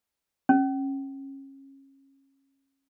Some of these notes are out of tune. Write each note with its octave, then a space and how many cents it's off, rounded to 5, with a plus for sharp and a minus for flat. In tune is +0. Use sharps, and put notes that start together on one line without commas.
C#4 -25